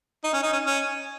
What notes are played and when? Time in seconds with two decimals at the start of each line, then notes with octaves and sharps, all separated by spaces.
0.24 D#4
0.33 C#4
0.43 D#4
0.53 C#4
0.66 C#4